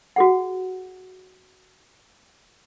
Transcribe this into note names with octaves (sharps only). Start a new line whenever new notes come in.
F#4 G#4 F#5